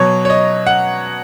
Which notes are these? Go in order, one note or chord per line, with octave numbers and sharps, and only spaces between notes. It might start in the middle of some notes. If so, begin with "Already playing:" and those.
Already playing: B2 F#3 C#5
C#5
D#5
F#5